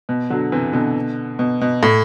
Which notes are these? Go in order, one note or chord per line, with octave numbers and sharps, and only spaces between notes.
B2
D3 F#3
C3 E3
B2 D3
B2
B2
A2